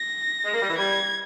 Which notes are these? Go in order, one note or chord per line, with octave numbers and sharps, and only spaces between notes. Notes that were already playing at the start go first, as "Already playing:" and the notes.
Already playing: A#6
G#3
A#3
G3
E3
G3 G#6